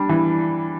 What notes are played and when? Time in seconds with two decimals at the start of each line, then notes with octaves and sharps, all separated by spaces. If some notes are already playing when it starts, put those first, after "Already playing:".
Already playing: G3 D4
0.09 E3